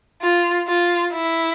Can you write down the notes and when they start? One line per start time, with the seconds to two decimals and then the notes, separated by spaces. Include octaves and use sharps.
0.22 F4
0.67 F4
1.13 E4